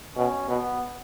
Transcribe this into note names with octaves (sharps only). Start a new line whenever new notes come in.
B2 C#4
B2 B3